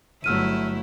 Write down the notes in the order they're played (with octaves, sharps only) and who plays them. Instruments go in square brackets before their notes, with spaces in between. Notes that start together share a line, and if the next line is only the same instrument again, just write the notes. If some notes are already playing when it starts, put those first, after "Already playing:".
[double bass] G1 F#3 [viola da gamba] A3 E4 [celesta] E6 F6 D#7